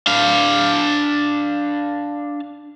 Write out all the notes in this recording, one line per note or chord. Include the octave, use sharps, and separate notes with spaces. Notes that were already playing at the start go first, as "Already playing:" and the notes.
D4 F5